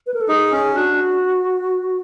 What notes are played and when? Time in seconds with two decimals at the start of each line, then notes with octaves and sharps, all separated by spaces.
0.07 B4
0.14 A#4
0.21 A4
0.28 D#4 G#4
0.52 C#4
0.75 D4 F#4